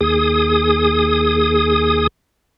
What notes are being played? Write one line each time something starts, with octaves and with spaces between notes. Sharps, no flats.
D#2 G#4 D#6